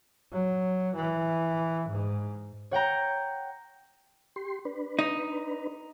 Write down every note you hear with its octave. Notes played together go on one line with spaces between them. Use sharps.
F#3
E3
G#2
C#5 F#5 G5 A#5
G4 C6
D4 B4
D#4